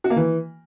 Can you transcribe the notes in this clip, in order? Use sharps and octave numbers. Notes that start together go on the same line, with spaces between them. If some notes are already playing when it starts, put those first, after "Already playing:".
F#4
A#3
E3